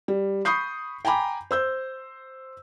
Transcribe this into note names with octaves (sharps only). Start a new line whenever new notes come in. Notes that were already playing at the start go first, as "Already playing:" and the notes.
G3
B5 C#6 D#6 G6 C7
G5 G#5 A#5 B5 D6
C5 E6 G6